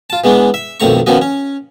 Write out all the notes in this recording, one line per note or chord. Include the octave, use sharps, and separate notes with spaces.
F4 A5
E3 G#3 B3 D4
E5
B1 F2 D#3 A3 A#5 C#6
D#3 F3 B3 C#4 F#4 D#5
C#4